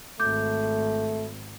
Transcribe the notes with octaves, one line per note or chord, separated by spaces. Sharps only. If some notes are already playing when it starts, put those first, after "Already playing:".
G#1 A3 D6 G6